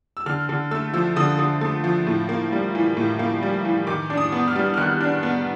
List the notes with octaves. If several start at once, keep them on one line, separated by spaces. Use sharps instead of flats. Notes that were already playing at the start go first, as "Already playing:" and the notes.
E6
D3 F6
D3
A3 E6
F3 E6
D3 D#6
D3
A3
F3
A2
A#3
G3
E3
A2
A#3
G3
E3
D#3 D6
D4
D#6
B3
F6
G3
F6
D#3 F#6
D4
B3